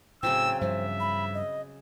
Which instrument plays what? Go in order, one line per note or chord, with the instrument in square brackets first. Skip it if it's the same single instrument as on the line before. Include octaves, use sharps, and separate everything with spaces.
[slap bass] A2 [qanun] C#3 F#3 C4 [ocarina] G5 [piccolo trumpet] E6
[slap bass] G2 F3 [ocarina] C5 [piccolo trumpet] E5
[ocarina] B5
D#5